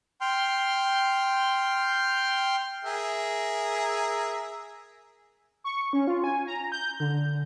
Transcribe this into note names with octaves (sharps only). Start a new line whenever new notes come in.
G5 C6 F6
G#4 A#4 E5
C#6
C#4
F4
G#5
A#5
G6
D3